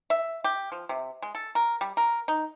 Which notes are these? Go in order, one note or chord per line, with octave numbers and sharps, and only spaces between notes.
E5
G4
F3
C3
G#3
A4
A#4
G3
A#4
D#4